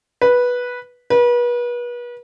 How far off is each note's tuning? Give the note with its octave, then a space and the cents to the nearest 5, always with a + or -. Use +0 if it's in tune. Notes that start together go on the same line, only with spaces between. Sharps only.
B4 -10
B4 -35